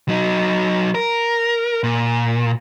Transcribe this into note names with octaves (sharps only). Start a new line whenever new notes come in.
F#3 D#4
A#4
A#2